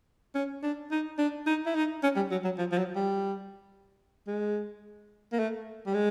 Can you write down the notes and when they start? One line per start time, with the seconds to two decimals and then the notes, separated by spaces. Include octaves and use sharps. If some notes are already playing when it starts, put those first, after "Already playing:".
0.35 C#4
0.63 D4
0.91 D#4
1.19 D4
1.47 D#4
1.66 E4
1.75 D#4
2.03 C#4
2.16 G3
2.31 F#3
2.45 F#3
2.58 F3
2.72 F3
2.78 F#3
2.95 G3
4.27 G#3
5.33 A#3
5.39 A3
5.87 G3
5.94 G#3